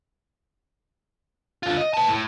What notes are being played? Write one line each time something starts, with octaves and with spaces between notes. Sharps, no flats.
D3 F4
D#5
B4 A5
A2